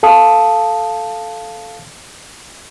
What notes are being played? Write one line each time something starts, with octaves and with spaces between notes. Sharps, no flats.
A4 F5 A5 D#6